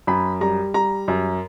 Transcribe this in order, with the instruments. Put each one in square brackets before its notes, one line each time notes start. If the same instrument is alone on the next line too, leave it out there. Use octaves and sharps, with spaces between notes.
[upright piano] F#2 B5
G3 A#5
G3 A#5
F#2